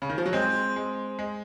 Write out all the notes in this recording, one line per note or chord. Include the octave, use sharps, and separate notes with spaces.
C#3
D#3
F3
F#3
G#3 C4
G#3
G#3